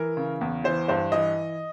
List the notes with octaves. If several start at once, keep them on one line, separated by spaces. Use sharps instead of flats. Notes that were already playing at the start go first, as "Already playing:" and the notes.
Already playing: E3 A#4
C#3
E2
E3 C5
G2 C5
E3 D#5